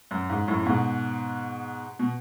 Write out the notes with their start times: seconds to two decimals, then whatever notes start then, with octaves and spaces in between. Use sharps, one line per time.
0.11 F#2
0.30 G#2
0.47 F#2 A2
0.66 G#2 B2
1.99 B2